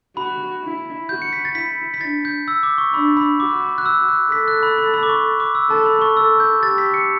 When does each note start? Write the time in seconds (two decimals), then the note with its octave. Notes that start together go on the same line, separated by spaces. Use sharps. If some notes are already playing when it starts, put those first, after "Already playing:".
0.17 F#4 B5
0.63 E4
1.09 F#4 G6
1.22 C#7
1.33 B6
1.45 A6
1.55 E4 B6
1.94 B6
2.01 D4 A6
2.25 G6
2.48 E6
2.63 D6
2.78 C#6
2.93 D4 B5
3.17 B5
3.40 F#4 D6
3.78 F#6
3.86 E6
4.08 F#6
4.32 A4 B6
4.48 F#6
4.63 B5
4.78 B5
4.94 B5
5.03 D6
5.09 C#6
5.40 D6
5.55 E6
5.70 A4 A5
5.86 B5
6.02 C#6
6.17 A4 E6
6.40 G6
6.63 G4 A6
6.78 B6
6.94 C#7